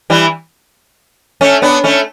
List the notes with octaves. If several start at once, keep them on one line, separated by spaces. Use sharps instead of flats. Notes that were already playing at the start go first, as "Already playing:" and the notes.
E3 G3
A3 C#4
B3 D4
A3 C#4